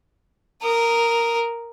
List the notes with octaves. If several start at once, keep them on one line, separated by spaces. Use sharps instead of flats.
A#4 D#6